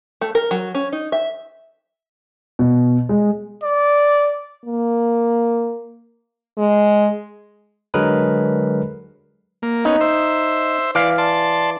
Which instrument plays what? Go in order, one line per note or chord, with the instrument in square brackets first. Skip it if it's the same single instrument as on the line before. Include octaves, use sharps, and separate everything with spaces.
[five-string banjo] A3
A#4
F#3
C#4
D#4
E5
[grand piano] B2
G#3
[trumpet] D5
[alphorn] A#3
G#3
[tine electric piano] D3 F#3 G#3 G#4 A#4 B4
[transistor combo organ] A#3
[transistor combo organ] B3 C#4 [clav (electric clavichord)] D#4
[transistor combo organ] C5 E5
[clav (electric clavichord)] E3 F5 [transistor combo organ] D5 D6
[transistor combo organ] D5 A5 C6